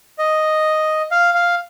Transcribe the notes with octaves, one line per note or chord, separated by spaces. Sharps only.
D#5
F5
F5